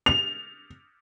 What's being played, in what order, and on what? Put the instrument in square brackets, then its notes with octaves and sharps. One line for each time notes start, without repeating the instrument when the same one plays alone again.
[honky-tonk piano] F7